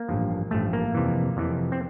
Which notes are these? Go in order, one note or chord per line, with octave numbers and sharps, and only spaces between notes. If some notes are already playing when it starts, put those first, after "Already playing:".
Already playing: A#3
A1 G2 F3
A1 G2 F3 A3
A#3
F2 C3 E3
F2 C3 E3
C4